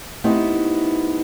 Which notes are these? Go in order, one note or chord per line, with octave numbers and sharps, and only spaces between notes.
A3 B3 C4 D#4 E4 G4